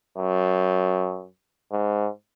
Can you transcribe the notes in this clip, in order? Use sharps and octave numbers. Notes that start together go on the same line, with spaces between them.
F#2
G#2